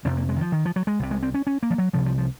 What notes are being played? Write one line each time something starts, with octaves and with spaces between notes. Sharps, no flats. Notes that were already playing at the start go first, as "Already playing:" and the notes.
F2 C3 C4
A#3
G#3
D#3
F3
D#3
F3
F#3
G#3
C2 C3
G#3
C4
C#4
C#4
A#3
F3
F#3
C2 C3 F3
F3
F3